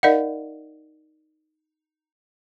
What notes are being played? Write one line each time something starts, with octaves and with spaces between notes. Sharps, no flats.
D#4 A#4 D5 D#5 F5 F#5